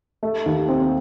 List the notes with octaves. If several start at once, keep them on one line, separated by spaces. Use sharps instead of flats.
A3
D#2
C4